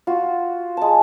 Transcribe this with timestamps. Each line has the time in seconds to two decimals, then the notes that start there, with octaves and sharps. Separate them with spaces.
0.07 F4 F#4
0.77 G#3 A5